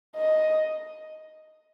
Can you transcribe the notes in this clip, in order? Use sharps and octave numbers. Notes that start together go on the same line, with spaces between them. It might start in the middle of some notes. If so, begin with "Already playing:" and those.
D#5